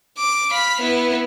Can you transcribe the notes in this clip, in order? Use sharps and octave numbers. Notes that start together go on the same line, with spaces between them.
D6
F5 B5
B3 E4